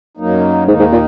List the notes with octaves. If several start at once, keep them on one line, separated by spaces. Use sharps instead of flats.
F#2 F#3 A#3 D#4
D#2 G#2 D#3 A#3 D#4
G#2
A#2